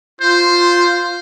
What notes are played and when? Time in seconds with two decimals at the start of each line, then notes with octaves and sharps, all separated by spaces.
0.21 F4 C5